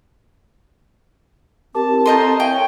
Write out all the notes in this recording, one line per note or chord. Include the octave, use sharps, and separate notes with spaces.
C4 G4 A#4 A5 D6
E4
A4 A#4 D#5 C6 D#6 G6
E5 F5 G5 G#5 C#6
C#5